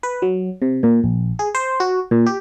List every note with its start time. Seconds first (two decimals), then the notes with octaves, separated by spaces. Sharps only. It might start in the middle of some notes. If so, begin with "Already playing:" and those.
0.03 B4
0.22 F#3
0.62 C3
0.83 A#2
1.04 A#1
1.39 G#4
1.55 C5
1.80 F#4
2.11 A#2
2.26 G4